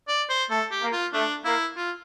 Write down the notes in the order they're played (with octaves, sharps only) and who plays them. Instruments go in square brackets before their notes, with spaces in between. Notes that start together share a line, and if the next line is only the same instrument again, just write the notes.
[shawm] D5
C5
[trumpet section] A3 [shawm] A4
[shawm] G4
[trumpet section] A#3
[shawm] F4
[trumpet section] A3 [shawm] D4
[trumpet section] A#3 [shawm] E4
[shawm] F4